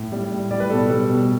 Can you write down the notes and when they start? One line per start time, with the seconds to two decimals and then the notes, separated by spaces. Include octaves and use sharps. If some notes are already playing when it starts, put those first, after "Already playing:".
Already playing: A2
0.12 G3
0.31 A2
0.51 G3 D5
0.60 B4
0.70 B2 A4
0.90 G3
1.09 B2